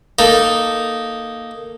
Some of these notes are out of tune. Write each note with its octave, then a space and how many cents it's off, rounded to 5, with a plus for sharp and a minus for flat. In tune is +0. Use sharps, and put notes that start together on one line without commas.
A#3 +0 D#4 +0 A4 +10